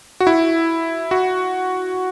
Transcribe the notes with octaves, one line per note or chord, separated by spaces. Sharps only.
F#4
E4
F#4